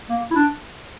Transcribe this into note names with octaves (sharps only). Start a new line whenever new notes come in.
A#3
E4
D4